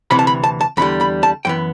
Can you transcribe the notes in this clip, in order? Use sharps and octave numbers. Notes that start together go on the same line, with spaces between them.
D2 C3 E3 B5
A5
B5
A5
A5
E2 D3 G3 B5
B5
A5
F#2 E3 B3 G5